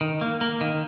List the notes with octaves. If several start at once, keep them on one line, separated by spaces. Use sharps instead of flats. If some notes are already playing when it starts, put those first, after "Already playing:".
D#3
A#3
A#3
D#3